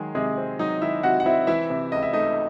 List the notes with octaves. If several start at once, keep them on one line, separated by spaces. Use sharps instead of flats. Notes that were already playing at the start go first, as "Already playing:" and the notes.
Already playing: D#3 F#3 G#3 G#4
C3 G#3 G#4
C4
F#3 D#4 D#5
D#3 E4 E5
C3 F#4 F#5
F#5
C4 E4 E5
E3 E4 E5
C3
C#2 D#5
E5
A3 D#4 D#5